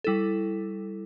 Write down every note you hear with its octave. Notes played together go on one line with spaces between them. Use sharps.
G3 E4 A4